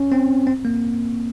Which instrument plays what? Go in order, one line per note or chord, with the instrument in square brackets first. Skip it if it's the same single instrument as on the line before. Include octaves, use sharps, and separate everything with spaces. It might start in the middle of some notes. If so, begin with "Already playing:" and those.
Already playing: [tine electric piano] C#4
C4
C4
A#3